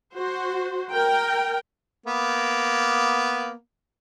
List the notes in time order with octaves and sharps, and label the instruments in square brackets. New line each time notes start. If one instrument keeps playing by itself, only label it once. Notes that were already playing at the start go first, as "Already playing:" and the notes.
[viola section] F#4 C5
A#4 G5
[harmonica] A#3 B3